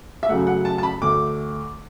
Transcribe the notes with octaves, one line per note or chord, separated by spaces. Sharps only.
E5
F#2 C#3 F#3 A3 F#5
F#5
A5
A5
B5
D2 D3 A3 D6